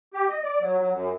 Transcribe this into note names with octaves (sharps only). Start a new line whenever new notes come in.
G4
D#5
D5
F#3
F#3
F#2